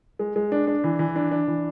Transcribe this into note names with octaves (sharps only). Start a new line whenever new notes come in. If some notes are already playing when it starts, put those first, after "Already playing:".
G#3
G#3
D4
D4
E3
E3
D4
D4
E3